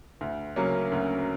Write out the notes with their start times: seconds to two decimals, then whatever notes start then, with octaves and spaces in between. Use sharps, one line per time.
0.21 D2
0.56 C#3 F#3 A#3 C#4
0.92 D2